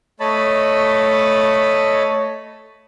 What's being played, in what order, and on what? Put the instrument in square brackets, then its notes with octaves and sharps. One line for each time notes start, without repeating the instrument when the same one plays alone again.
[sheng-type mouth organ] A3 C#5 D#5 A5 B5